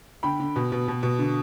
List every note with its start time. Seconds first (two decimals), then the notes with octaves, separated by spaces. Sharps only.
0.23 D3 G5 B5
0.40 D3
0.56 B2
0.72 B2
0.88 B2
1.03 B2
1.19 D3